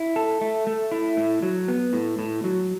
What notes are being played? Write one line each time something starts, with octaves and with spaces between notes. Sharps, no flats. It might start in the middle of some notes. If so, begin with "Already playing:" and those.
Already playing: E4
A4
A3
A3
E4
A2
F#3
B3
A2
A2
F#3